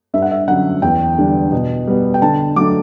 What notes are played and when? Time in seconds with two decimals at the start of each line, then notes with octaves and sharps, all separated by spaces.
0.14 G2 E5
0.22 F#5
0.31 E5
0.48 D3 F#3 C#4 F#5
0.82 E2 G5
1.18 D3 G3 D4
1.52 B2
1.87 G3 B3
2.14 G5
2.22 D3 A5
2.56 F#3 A3 D4 D6